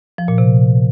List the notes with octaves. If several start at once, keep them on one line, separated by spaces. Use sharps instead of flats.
F3
A#2
C3